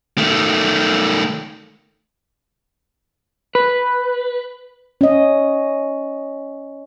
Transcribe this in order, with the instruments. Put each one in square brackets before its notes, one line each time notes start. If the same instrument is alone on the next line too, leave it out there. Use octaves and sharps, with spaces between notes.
[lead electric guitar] D#3 A3
[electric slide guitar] B4
[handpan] C#4 D#5